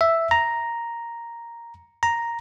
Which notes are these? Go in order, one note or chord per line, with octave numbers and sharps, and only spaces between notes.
E5
A#5
A#5